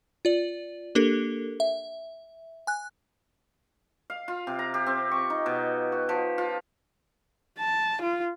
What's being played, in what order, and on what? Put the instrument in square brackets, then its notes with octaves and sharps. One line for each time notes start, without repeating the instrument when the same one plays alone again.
[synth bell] F4 D5
A#3 D4 G4 A4 A#4
E5
G#5 F#6
[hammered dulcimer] F5
F4
C3
A#5
G4
C4
C#6
D#4
B2
F#4
F3
F4
[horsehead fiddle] A5
F4